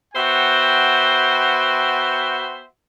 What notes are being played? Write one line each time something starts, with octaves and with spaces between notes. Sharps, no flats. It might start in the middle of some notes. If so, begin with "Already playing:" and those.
B3 F#4 C5 E5 G5